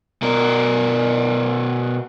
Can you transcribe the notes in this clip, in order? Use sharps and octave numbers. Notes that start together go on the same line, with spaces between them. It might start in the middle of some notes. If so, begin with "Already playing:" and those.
B2 A#4